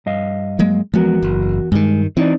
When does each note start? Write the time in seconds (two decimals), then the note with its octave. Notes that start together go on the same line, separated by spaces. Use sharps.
0.06 G2 D#5 F5
0.59 F#3 G#3 A#3
0.94 E2 F3 G#3 B3 F#4 A#4
1.23 F#1
1.72 G2 D#3 G#3
2.17 E3 C4 D#4 D5